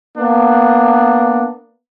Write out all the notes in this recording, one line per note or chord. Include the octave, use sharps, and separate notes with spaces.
A#3 B3 D4